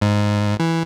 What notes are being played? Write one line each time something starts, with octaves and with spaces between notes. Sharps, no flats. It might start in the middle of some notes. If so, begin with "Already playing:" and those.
G#2
E3